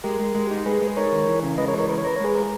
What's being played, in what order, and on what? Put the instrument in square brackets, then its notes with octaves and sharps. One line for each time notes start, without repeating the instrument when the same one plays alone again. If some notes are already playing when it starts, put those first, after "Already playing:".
[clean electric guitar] G#3 [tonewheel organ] G4 A#4
[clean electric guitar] G#3
G#3
D#4
[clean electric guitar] G#3 [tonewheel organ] G#4 B4
[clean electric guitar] G#3
[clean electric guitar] D#4 [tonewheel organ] A#4 C#5
[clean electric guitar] D#3
E3
C#3
[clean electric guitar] G#3 [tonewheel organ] B4 D#5
[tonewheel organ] A#4 C#5
[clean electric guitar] E3
[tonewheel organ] A#4 C#5
[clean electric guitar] A#4 [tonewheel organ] B4
[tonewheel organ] C#5
[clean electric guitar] A#4 [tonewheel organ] B4
[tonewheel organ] C#5
[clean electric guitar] G#3 [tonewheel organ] G#4 B4
[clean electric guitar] A#4